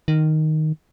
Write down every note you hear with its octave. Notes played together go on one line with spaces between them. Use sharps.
D#3